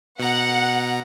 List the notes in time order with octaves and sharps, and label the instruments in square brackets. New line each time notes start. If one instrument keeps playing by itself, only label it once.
[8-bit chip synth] B2 A#5 [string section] F#5